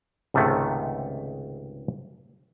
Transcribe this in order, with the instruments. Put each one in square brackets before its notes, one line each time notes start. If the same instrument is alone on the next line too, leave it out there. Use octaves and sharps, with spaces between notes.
[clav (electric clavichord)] C#2 G#2 C3 D#3 A3